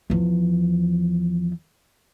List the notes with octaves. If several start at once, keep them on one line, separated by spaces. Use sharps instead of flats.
E2 F3